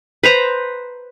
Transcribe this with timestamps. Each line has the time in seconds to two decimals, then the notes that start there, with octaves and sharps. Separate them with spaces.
0.23 B4 C5 A#5